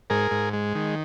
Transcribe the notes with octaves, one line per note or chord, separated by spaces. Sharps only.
G#2 G#4 A#4
G#2
G#3
D#3